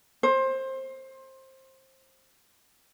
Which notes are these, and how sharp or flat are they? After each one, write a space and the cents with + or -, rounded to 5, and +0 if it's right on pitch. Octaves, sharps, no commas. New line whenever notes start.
C5 +20